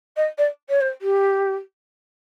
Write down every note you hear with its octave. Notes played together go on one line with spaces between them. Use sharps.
D#5
D5
C#5
C5
G4